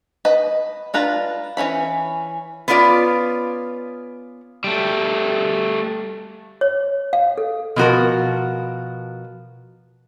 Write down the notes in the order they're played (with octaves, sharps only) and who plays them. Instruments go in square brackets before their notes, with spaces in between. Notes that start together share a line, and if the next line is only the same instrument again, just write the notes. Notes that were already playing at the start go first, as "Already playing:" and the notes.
[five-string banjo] B4 D#5
D4 F4 B4 A#5
E3 F#3 C#4 B5
[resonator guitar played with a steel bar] B3 C#4 D4 F4 D5
[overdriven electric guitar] G3 A3
[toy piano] C#5
F5
A4
[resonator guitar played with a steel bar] B2 F3 F#4 A#4